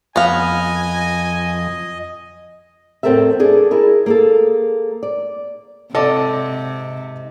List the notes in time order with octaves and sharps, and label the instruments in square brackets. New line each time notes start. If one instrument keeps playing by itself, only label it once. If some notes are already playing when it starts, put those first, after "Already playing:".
[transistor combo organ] F2 [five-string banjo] B3 F5 [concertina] D#5 [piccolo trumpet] G#5
[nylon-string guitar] E2 A2 C4 A4 A#4 E5
D4 G#4 A4
E4 G#4 A#4
A#3 G#4 A4
D5
[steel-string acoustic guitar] G#2 D#5 F#5 [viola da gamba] C3 [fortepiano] A4 D5